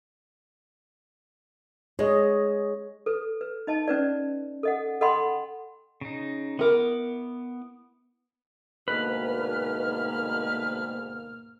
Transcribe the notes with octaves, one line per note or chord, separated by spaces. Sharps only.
G#3 C#5 D#5
A4 B4
B4
D#4 D#5 A5
C#4 B4 D5
A4 D#5 F#5
A4 D#5 F#5 G5 B5 C6
C#3 D#4
B3 E4 A#4 D6
D2 G#2 B2 A#3 B4 F6